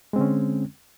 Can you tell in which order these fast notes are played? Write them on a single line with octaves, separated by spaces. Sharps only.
G#3 C4 D3 C#4